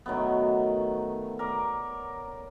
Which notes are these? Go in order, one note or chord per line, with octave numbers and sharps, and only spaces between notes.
D#3 F#3 A3 B3
A#4 D5